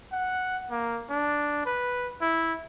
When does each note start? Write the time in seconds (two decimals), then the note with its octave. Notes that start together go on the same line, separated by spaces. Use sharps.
0.12 F#5
0.70 A#3
1.10 D4
1.66 B4
2.21 E4